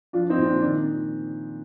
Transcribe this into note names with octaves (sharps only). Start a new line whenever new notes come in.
F3 D4 F4
C4 D#4
A#2
D4
D#3 D4